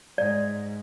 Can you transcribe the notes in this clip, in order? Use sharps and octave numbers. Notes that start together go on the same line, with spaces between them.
G#2 D5